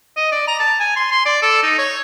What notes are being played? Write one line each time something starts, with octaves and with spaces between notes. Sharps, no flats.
D#5
D5
A#5
A5
G#5
C6
C6
D5
A4
D#4
C#5